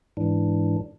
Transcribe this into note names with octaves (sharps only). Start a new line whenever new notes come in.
G#2 E3 D4